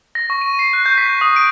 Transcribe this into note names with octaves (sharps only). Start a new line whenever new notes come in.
A#6
C#6
D#7
C7
F#6
G6
B6
D#6
D7